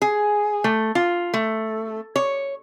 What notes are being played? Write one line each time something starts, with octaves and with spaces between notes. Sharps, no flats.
G#4
A3
F4
A3
C#5